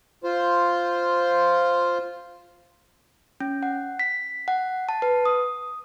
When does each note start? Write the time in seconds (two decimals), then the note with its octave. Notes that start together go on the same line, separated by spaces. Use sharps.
0.24 F4 C5
3.40 C#4
3.63 F#5
3.99 B6
4.48 F#5
4.89 A5
5.02 B4
5.25 D#6